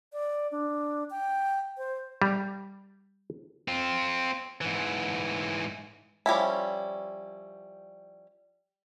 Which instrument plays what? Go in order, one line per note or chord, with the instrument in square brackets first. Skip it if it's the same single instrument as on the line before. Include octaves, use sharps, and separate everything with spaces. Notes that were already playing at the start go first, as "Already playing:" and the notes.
[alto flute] D5
D4
G5
C5
[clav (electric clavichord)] G3
[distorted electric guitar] C4 F4
G#2 E3
[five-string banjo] F3 G3 C#4 E4